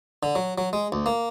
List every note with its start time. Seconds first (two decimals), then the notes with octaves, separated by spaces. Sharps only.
0.23 D3
0.35 F#3
0.58 F#3
0.73 G#3
0.92 D2
1.06 A#3